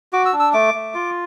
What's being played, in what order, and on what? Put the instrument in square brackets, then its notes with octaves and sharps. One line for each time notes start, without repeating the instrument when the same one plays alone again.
[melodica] F#4 D6
E6
D4
E6
A3 D6
A3
F4